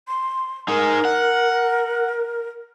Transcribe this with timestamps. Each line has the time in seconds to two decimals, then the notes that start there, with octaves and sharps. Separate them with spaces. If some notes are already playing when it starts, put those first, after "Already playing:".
0.08 C6
0.68 D#4 G#4 A#4
1.05 F#5